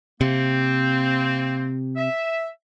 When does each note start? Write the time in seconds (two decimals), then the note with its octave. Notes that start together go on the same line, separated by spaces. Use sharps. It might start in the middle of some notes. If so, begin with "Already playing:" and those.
0.21 C3 A#3 C4
1.96 E5